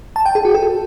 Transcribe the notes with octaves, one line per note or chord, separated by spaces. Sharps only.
A5
G5
G#4
F#4
A4